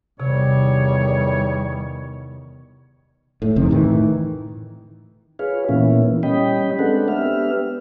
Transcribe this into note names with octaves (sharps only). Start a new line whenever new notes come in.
E2 C3 D#3 G3 C#5
A2
F1 F2 C3 D#3
A2 D#3 E3
F4 G#4 B4 C#5 F5
A#2 E3 A#3 B3 C#4 E4
G3 C#4 D#5 G5 B5
G#3 C4 D4 A4 B4 F#5
B3 D4 G4 B4 E5 F6